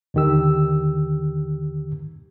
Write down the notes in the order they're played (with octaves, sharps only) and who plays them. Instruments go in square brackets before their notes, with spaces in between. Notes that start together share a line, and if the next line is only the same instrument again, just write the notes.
[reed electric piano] D#2 D3 D#3 G4 E6